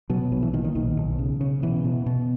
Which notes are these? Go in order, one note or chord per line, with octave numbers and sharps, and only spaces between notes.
B2 F#3
A#1 F#3
E3
A#2 D#3
D#3
B1 D#3
B1
C#3
C#3
B2 E3
B2
B2